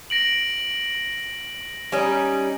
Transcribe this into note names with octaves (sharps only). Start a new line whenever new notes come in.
A#6 D7 F#7
G3 C#4 D#4